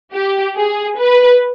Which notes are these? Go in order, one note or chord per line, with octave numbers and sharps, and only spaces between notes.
G4
G#4
B4